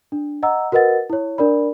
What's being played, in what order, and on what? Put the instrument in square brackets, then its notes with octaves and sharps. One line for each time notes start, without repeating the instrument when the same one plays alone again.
[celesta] D4
D#5 F#5 A#5 E6
F#4 A#4 B4 D#5 F#5 A6
E4 C#5
D4 A#4 D5 B5